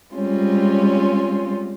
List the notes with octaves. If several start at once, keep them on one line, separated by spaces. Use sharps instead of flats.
G3 G#3 C4 C#4 F4